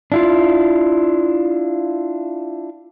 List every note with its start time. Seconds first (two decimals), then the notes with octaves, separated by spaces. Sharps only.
0.12 D4 E4 F4